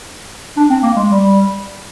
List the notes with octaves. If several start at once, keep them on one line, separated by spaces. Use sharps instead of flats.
D4
C4
A#3
G#3
G3